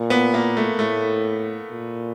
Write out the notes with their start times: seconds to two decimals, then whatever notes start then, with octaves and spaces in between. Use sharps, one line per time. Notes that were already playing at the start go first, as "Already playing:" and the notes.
Already playing: A#2
0.10 B3
0.34 A#3
0.57 A3
0.79 A2 A3
1.71 A#2